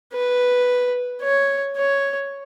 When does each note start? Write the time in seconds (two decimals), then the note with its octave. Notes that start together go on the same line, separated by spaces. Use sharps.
0.13 B4
1.22 C#5
1.77 C#5